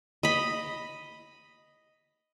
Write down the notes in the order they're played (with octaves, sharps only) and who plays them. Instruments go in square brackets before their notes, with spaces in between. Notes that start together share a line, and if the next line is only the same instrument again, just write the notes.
[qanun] D#5 B5